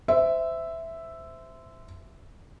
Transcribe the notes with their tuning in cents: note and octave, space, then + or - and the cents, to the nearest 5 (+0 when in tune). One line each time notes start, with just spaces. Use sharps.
C5 -25 E5 +0